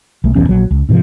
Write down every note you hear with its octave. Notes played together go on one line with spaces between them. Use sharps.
B1 A3
D1 B1 E2 C#4
A#1 F#3
C#2
G#2 C3 D#3 F3